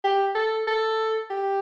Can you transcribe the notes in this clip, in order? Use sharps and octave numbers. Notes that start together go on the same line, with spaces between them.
G4
A4
A4
G4